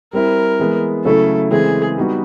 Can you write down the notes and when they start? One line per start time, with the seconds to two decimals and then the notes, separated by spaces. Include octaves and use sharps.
0.13 G3 C4 E4 A#4
0.59 E3 G#3 B3
1.04 C#3 F#3 A3 C#4 E4 A4
1.50 C#3 E3 G#3 C4 G#4
1.98 G3 B3 D#4 F#4